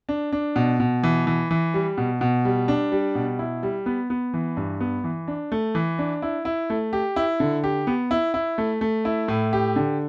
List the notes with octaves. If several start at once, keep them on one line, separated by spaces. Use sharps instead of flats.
D4
D4
B2
B2
E3
E3
E3
G3
B2
B2
G3
D4
G3
B2
E4
G3
B3
B3
E3
G2
B3
E3
D4
A3
E3
D4
E4
E4
A3
G4
E4
D3
G4
B3
E4
E4
A3
A3
E4
A2
G4
D3